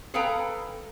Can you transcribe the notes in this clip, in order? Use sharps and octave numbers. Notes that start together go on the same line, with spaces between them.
G#4 A4 B4 F5 G5 A#5